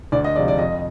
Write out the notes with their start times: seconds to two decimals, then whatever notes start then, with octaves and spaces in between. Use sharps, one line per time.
0.12 D2 D5
0.24 D#5
0.36 C3 F3 G#3 D5
0.48 D5
0.58 F2 D#5